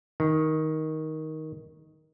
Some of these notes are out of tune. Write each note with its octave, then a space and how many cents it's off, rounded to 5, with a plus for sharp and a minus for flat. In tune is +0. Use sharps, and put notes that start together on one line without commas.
D#3 +10